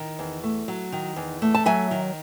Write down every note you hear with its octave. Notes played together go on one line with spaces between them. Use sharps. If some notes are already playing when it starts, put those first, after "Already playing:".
Already playing: D#3
E2
A3
F#3
D#3
E2
A3
A5
F#3 E5 G#5
D#3